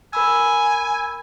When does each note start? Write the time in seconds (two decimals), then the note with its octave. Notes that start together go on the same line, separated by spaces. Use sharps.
0.13 A#4 G#5 B5 E6